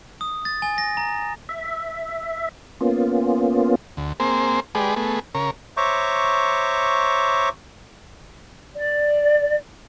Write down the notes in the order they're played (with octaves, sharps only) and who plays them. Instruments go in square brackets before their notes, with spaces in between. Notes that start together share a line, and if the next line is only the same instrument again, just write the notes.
[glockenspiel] D#6
A6
G#5
A#6
A#5
[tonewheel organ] E5
A#3 B3 C#4 F4
[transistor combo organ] D2
A#3 C4 G#4 C5
G#3 G4 G#4 B4 D5
A3 B3 G#4
C#3 A#4 C#5
[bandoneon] C5 C#5 E5 A#5 C#6 D6
[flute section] D5